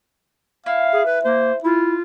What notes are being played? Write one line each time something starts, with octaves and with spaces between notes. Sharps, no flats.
E4 F5
G#4
B4
A#3 C5
E4 F4